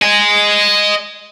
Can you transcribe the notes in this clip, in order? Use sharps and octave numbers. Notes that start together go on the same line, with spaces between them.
D#5 G#5